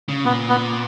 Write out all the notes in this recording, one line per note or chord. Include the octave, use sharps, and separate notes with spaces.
C#3
A#2 B3
B3